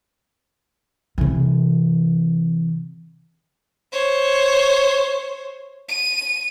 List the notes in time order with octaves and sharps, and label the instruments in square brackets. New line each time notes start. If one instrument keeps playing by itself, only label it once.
[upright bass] C3 E3
[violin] C5 C#5
D#7